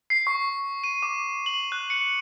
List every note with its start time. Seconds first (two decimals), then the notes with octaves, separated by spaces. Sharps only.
0.10 C7
0.27 C#6
0.84 D#7
1.03 D6
1.46 F#7
1.72 F#6
1.90 C#7